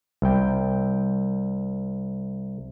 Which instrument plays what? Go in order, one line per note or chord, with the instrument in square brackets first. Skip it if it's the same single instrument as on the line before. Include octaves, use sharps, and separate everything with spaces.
[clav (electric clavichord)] C2 G5